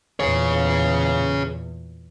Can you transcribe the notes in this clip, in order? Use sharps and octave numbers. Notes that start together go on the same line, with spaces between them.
E2 A#2 G#4 C#5